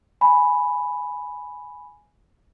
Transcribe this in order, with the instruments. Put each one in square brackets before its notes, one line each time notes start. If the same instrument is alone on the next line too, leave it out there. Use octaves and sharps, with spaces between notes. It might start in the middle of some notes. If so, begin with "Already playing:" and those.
[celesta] G#5 B5